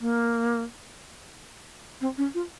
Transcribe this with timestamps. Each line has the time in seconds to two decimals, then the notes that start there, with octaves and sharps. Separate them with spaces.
0.01 A#3
2.01 C4
2.18 C#4
2.34 F4